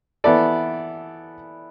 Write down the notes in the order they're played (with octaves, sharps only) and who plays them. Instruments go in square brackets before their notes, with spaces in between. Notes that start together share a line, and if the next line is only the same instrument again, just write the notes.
[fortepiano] E3 B3 E4 A4 D5